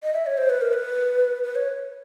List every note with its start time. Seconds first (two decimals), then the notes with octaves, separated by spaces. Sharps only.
0.03 D#5
0.14 E5
0.26 C#5
0.38 C5
0.50 B4
0.61 A#4
0.73 B4
1.44 B4
1.55 C#5